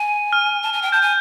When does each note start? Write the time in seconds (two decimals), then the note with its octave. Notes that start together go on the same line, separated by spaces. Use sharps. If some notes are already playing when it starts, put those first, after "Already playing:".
Already playing: G#5
0.33 F6
0.62 A5
0.73 G#5
0.82 G5
0.92 A5 G6
1.02 G#5